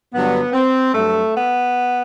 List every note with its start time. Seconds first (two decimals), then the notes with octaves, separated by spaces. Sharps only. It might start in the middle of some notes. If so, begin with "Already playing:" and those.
0.13 G2 D3 F#3 B3
0.53 C4
0.94 G2 F#3 A3
1.34 B3